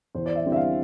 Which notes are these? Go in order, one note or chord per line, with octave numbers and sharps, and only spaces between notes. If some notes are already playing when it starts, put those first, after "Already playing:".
E2 C5
D5
E5
D3 G3 C4 E4
E5
F5